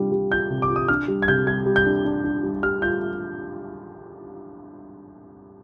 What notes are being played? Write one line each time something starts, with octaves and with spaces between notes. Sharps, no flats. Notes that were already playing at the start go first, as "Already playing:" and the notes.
Already playing: C3 G3 D4 F4
G3
F4 G6
C3
D6
F4
D#6
D4 F6
G3
G#6
C3 G6
G3 G#6
G3
G6
D4
D4
D4
G3
G3 F6
F4 G6